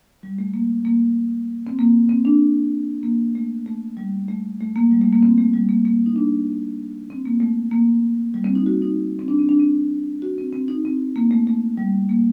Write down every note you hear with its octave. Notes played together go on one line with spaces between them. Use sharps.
G3
A3
A#3
A#3
C4
A#3
C4
D4
A#3
A3
A3
G3
A3
A3
A#3
G3
A3
A#3
C4
A3
G3
A#3
A#3
D#4
D4
C4
A#3
A3
A#3
G3
C4
D#4
F#4
D#4
C4
D4
C4
D4
C4
F#4
C4
C4
D#4
C4
A#3
A3
A3
G3
A#3